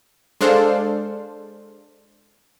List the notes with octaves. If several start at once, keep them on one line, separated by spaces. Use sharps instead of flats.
G#3 D4 A4 C5 F5